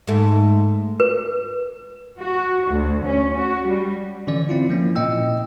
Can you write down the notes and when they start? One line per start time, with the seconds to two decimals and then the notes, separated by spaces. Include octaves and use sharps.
0.07 G#2 A3
1.00 B4
2.18 F#4
2.71 D2
3.05 C#4
3.36 F#4
3.67 G3
4.27 D3 E3 C#4 D5
4.49 C4 E4 F4
4.69 F3 A#3 C#4
4.96 A#2 E4 D#5 G5 E6